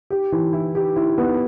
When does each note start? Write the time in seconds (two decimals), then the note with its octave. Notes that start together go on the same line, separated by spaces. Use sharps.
0.10 G4
0.32 E3
0.53 E4
0.75 G4
0.96 E4
1.18 B3